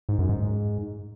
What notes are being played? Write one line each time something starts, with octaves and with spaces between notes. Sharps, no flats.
G#2
F#2
G#2